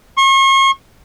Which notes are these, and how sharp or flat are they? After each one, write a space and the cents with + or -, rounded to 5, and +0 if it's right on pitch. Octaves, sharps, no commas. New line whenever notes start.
C#6 -40